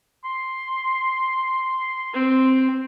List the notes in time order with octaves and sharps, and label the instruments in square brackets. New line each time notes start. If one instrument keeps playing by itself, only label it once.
[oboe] C6
[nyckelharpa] C4